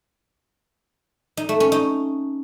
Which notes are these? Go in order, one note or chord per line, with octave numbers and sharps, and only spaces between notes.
D#4
A3
C#4
D#4